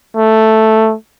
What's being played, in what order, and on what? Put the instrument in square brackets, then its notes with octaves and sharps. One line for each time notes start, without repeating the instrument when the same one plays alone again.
[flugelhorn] A3